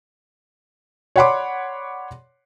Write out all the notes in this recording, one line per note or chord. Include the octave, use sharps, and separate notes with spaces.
C#5 D5 F#5 B5 C6 D6